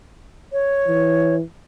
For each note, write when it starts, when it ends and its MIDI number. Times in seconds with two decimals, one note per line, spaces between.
0.52 1.35 73
0.88 1.43 52